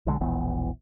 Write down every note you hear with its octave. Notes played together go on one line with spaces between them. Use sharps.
B1 D3 G#3
E1 A#1 E3 B3